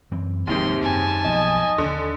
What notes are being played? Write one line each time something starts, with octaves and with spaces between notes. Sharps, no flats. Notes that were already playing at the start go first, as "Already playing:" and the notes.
F#2 E3 C4
F1 D#2 G#2 C3 D#3 C6
F#2 G#5 A5
B1 F3 B3 D#5
D#2 D3